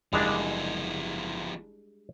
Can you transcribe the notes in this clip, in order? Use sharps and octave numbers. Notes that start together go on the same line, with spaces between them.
F#1 F3 G3 G#3 B3 D4